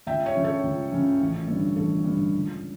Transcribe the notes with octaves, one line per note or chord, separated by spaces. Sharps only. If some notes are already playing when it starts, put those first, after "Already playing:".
C#2 E5 G5
C#5 E5
C#3 F3 C#4
A4 C#5
C#2
C#3 F3 C#4
A1
G2 D3
A1 A4
G2 D3
C#2